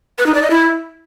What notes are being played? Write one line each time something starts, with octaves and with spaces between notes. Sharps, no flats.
B4
D#4
D5
D#5
E4